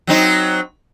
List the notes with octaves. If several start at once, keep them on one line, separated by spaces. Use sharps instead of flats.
F#3 C4 D#4